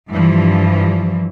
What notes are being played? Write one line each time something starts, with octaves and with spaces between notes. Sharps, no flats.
G2 E3 F3